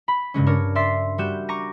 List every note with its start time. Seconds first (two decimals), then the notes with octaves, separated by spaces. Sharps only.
0.08 B5
0.34 G2 C#3 G#3 C#4
0.46 D4 A#4 C#5
0.75 D5 E5 C6 A6 B6 C7
1.18 G3 F#4 G6 E7
1.49 A#5 C#6 D6 A#6 D#7